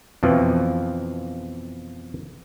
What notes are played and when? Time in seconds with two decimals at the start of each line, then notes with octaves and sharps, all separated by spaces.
0.23 F2 B2 E3 F3